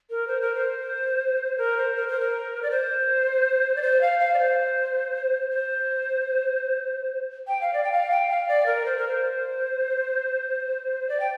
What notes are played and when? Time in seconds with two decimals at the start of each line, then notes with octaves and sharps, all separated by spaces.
0.10 A#4
0.28 C5
0.41 A#4
0.55 C5
1.58 A#4
1.77 C5
1.96 A#4
2.08 C5
2.20 A#4
2.63 D5
2.71 C5
3.76 D5
3.82 C5
4.01 F5
4.19 F5
4.34 D5
4.38 C5
5.50 C5
7.47 G5
7.61 F5
7.74 D5
7.84 G5
7.92 F5
8.11 G5
8.29 F5
8.48 D5
8.66 A#4
8.85 C5
8.97 A#4
9.08 C5
11.09 D5
11.20 G5